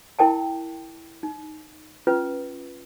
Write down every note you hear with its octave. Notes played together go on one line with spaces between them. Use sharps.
E4 A#4 G5 A5
D#4
C#4 F4 B4